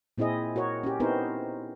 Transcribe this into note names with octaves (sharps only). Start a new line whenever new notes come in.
A#2 C4 E4 G#4 D#5
F#4 A#4 C#5
C#4 G4
B3 C4 D#4 E4 A#4 C5